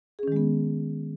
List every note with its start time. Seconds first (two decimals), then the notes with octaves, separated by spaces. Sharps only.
0.19 G#4
0.23 C#4
0.28 D#3
0.32 G#3
0.36 B3